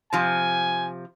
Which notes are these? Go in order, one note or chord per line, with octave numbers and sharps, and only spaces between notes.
C3 F3 G#5